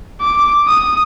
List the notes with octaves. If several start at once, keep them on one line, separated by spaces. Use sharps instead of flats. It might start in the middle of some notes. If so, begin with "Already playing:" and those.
D6
D#6